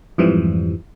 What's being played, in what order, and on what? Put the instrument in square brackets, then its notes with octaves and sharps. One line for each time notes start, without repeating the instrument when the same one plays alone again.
[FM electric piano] F2 G#2 E3 F3 G3